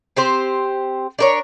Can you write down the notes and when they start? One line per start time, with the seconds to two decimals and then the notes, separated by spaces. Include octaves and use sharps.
0.17 C4 G4 C5
1.19 D4 A#4 C#5